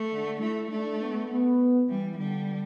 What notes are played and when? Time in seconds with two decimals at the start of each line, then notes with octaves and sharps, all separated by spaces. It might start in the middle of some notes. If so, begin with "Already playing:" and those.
Already playing: A3
0.12 D3
0.41 A3 E4
0.71 A3 D4
1.01 B3
1.30 B3
1.89 E3 G3
2.18 D3 G3